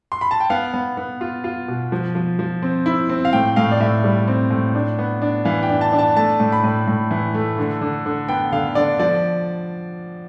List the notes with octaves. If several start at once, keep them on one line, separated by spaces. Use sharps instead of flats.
C6
B5
A5
G5
B3 F5
B3
B3
F4
F4
B2
F3
F3
F3
C4
E4
C4
F5
A2 G5
A2 F5
D5
A2 E5
G3
C4
A2
D4
B3
D4
E3 F5
G5
D4
A5
D4
A5
A3 A5
A2
B5
A2
A2
E3
A3
D3
D3
D3
B3 G5
D3 F5
D3 D5
F3 D5